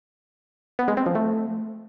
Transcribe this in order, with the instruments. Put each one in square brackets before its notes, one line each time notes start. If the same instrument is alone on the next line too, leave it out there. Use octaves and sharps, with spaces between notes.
[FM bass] B3
G#3
C4
F3
A3